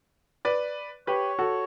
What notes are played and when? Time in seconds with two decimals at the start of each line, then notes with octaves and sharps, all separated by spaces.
0.45 B4 D5
1.07 G4 B4 C#5
1.39 F#4 A4